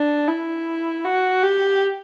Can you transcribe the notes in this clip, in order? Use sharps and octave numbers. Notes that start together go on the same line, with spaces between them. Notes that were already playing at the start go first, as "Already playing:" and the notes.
Already playing: D4
E4
F#4
G4